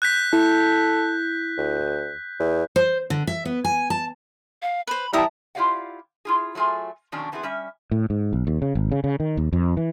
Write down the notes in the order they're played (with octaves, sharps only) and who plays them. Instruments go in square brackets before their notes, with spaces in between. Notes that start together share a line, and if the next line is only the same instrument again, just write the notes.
[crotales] F#6 G6 B6
[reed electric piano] E4 [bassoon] A4
[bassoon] D2
E2
[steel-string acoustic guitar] C5
D3
E5
B3
G#5
A5
[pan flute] F5
[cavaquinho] B4 C5 [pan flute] B5
[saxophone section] E3 G3 E4 [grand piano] E5 A5 [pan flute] G5 [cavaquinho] A#5 D#6
[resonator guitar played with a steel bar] E4 F4 G4 D5 F5 F#5
E4 F4 G#4
F#3 A3 F4 G#4 G#5
F2 B2 D#3 F#3 C#4 D4
E3 B3 C4 E4 G#4
G3 C#4 E5
[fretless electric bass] A2
G#2
B1
D#2
C#3
G#1
C#3
C#3
D#3
D#2
F2
E3